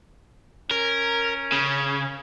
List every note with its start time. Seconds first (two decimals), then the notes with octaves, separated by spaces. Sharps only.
0.71 C#4 A#4
1.52 C#3